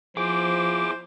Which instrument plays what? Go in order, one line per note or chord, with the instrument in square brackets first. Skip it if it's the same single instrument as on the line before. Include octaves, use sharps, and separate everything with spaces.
[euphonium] F3 [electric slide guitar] E4 G#4 [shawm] C5 [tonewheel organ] D6